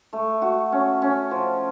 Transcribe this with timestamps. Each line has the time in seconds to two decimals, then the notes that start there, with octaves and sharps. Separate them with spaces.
0.13 A3
0.42 F#4
0.72 C#4
1.02 C#4
1.31 F3